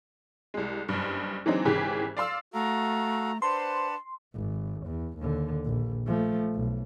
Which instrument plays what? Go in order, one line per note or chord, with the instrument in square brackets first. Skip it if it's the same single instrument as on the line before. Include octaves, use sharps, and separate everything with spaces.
[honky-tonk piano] C2 G#3
F#1 G2
E3 F#3 G#3 C4 D4 D#4
G#1 C#3 E3 G4 G#4
D5 F5 C6 E6
[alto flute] A3 [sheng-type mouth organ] F#4 A4 F5 [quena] A#5
[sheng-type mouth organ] D4 B4 F#5 [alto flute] C5 [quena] A5 [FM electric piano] C6
[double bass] G#1
E2
D#2 D3
A#1
F3 A3
B1